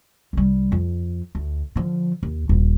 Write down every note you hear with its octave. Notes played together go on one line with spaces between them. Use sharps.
C2 G3
F2
D2
D3 F3
D#2
D#1